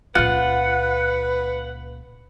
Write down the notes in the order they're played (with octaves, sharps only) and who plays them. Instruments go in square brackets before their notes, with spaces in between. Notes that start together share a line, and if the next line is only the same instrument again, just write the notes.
[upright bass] C#2 A#2 [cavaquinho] F4 [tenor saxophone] B4 [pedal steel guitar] F#5